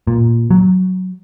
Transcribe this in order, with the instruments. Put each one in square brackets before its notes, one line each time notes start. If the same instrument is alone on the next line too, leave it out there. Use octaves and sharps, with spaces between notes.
[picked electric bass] A#2
F#3